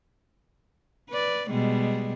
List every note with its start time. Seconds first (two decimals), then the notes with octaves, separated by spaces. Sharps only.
1.10 B4 D5
1.50 B2 G3 G#3